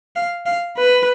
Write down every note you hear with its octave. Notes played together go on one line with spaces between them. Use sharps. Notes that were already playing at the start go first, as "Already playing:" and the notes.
F5
F5
B4